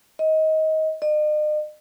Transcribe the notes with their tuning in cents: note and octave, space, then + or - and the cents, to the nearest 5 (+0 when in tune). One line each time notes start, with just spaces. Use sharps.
D#5 +20
D#5 -45